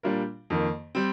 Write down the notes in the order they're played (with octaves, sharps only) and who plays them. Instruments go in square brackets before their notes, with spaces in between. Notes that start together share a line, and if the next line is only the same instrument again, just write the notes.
[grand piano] A#2 G3 D4 F4 A#4
F2 D#3 A#3
G3 C4